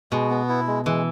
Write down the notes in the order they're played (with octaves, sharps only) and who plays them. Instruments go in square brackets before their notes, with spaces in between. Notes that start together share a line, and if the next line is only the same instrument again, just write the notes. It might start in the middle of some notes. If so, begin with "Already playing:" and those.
[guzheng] B2 [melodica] G#3
[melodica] B3
E4
G#3
[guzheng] E3 [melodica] G#3